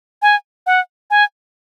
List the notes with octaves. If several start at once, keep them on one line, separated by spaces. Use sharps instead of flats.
G#5
F#5
G#5